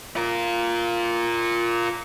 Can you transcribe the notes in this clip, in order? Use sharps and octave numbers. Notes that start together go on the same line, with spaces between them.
F4 A#4